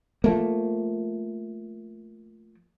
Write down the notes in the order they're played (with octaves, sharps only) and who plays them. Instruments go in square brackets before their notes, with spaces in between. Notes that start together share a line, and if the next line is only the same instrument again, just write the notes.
[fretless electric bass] F3 A3 A#3